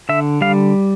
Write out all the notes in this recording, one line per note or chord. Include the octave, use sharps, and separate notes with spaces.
D3 E5
G3 F5